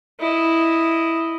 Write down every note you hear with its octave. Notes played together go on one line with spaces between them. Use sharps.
E4 D#5